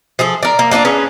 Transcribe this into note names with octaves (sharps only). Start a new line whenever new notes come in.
F3 G#4 A4
A#4 D5
A#3
A#3 D4 E4 F4
C#4 G#4 B4